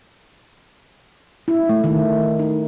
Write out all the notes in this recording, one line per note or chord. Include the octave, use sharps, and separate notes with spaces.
E4
A3
D#3
D#4